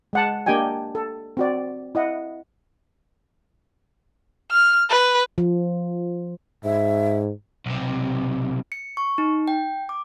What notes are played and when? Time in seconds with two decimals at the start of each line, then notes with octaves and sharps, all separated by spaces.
0.13 G#3 F#5 A5
0.46 A#3 D4 G4 D#5 G5 G#5
0.95 A4
1.37 C4 F#4 D5
1.95 E4 D#5 F#5
4.51 F6
4.90 B4
5.38 F3
6.64 G#2 E5
7.66 B1 C3
8.72 C#7
8.97 C#6
9.18 D#4
9.48 G5
9.89 D6